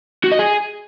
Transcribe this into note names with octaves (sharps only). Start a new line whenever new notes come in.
F#4
D#5
G#4